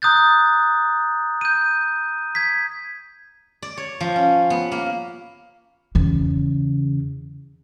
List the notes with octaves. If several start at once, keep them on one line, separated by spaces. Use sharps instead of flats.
A#5 D#6 F#6 G6 A6
G6 D#7
G#6 B6
D5
C#5
F3
C#4
B3
A#3
E2 C#3